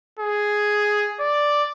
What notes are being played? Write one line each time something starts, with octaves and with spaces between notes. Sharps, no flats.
G#4
D5